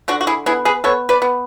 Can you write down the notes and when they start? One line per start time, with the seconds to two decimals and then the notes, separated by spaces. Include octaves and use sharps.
0.08 D3 D4 F#4
0.21 F#4
0.27 E4 G#4
0.46 B3 E4 G#4
0.65 G#4 B4
0.84 B3 A4 C#5
1.09 B4 D5
1.22 B3